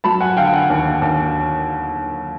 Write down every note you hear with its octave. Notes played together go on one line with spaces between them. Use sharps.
F#3 A5 B5
F#5 G#5
D3 F5 G5
F#5 G#5
D#2
D#2